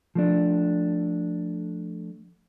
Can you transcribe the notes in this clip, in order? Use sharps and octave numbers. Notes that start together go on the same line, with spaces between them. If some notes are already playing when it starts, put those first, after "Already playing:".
F3 A3 D4